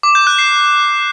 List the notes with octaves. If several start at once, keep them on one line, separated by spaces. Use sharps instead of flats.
D6
G6
F#6
C7